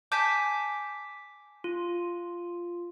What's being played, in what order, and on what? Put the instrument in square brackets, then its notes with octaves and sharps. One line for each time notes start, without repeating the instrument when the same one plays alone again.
[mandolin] G#5 A5 G6 [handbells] D6 B6
[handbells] F4